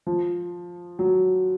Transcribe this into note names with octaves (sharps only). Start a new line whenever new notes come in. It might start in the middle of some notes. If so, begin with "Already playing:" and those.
F3
F#3